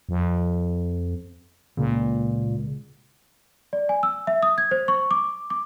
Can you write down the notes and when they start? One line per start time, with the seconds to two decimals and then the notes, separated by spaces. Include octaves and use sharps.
0.09 F2
1.77 C#2 A#2
3.73 D5
3.89 G#5
4.03 E6
4.27 E5
4.43 D#6
4.58 G#6
4.71 C5
4.88 C#6
5.11 D6
5.50 D6